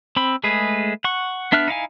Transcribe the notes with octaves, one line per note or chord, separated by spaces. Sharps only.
C4 B5 E6
G#3 A3 G#4 B4
F#5 C#6
B3 D4 E5 F6 F#6
D#4 E4 F5 G#5